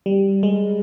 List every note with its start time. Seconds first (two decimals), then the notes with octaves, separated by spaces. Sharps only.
0.06 G3
0.43 G#3